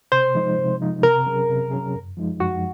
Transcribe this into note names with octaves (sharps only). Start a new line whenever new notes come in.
C3 C5
F3 G#3 D#4
C3
F3 G#3 D#4
C3 A#4
F#3 C#4 G#4
C3
F#3 C#4 G#4
F#2
F3 G#3 D#4
F#2 F#4